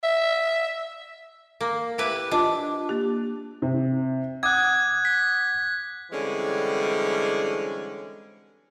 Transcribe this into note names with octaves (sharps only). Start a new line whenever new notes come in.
E5
A#3
E4 G4 B4
D4 F4 D#5
A#3 G4
C3
F#5 D6 D#6 F#6 G#6
B6
D3 E3 G3 G#3 C4 C#4